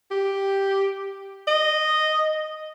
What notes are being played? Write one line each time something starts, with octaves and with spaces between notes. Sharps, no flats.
G4
D#5